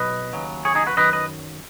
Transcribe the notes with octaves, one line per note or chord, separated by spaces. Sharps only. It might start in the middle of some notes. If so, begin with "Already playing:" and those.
Already playing: B1 B2 F#3 B4 D#5
D#2 C#3 F#3
G#4 C#5
D#4 G#4
F#4 B4
F#2 D#3 F#3 B4 D#5
B4 D#5